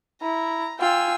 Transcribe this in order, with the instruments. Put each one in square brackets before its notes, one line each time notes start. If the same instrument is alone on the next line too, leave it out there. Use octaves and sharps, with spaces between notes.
[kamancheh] E4 [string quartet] A#5
[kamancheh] F4 [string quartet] G5 G#5 E6